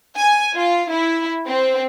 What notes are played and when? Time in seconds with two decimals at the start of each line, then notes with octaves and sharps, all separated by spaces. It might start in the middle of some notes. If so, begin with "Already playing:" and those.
0.17 G#5
0.55 F4
0.91 E4
1.48 C4